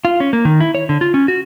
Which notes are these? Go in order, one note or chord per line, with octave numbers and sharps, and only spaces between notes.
F4
C#4
A#3
D#3
E4
C#5
D3
F4
C#4
F#4